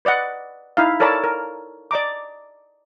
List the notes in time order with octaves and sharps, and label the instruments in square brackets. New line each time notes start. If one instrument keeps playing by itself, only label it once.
[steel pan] B4 D5 D#5 F#5
D#4 E4 F5
A4 A#4 C#5 D5 A5 B5
A#4
D5 D#5 A#5 D6